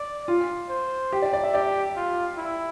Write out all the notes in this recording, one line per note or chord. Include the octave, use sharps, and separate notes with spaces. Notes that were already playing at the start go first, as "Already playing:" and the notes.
Already playing: D5
F4
C5
G4
D5
D5
E5
G4 D5
F4
E4